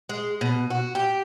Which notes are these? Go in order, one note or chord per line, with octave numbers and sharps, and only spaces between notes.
G#3
B2
F#4
G4